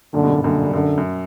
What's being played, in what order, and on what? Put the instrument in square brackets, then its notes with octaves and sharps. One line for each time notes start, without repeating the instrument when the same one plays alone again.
[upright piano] F#2 A#2 [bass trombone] D3
[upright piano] G2 B2
G2 B2
[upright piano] F#2 A#2 [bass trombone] D3
[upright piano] G2
[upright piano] F#2 [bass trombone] D3
[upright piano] F#2